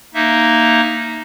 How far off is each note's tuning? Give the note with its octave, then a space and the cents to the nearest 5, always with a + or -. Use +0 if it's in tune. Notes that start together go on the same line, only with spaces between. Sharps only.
A#3 +0 D#4 +0 E5 +0